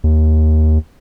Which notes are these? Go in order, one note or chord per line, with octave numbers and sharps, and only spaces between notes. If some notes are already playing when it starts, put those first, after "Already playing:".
D#2